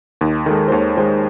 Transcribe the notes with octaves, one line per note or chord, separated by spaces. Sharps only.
D#2 D#4
D#3 G#3 A4
C5
D#2 C#5
D#3 G#3 C5